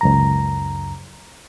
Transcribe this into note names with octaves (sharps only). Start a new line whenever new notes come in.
C#2 F#2 A#5